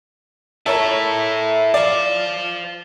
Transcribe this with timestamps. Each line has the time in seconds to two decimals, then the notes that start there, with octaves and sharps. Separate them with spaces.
0.66 E4 A4 A#4 C#5 E5
1.74 C5 D5 F5